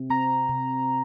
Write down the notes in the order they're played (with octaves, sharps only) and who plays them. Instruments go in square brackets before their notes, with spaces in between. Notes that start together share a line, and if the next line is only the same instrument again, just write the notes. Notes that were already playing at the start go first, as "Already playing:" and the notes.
Already playing: [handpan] C3
[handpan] C4 [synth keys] A#5
[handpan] C3